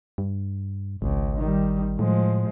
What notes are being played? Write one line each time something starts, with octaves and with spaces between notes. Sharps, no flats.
G2
G#1 C#2
D#3 G3
A2 F3 G#3